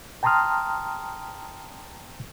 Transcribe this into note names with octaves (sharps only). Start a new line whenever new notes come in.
G5 A5 A#5 C6 D#6 F6